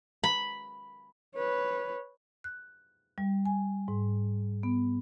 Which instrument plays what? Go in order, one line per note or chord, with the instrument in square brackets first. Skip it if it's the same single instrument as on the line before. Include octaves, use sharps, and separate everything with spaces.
[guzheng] B5
[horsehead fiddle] B4 C#5
[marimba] F#6
G3
G#5
G#2
B3